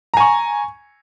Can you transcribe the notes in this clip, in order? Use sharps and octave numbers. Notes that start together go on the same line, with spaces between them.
G#5 A#5 C#6